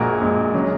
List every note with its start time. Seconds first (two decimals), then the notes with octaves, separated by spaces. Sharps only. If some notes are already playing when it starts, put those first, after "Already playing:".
Already playing: A#1 A#2 G#3 F#4 A#4
0.21 A#1 A#2 G#3
0.54 C#3 F#3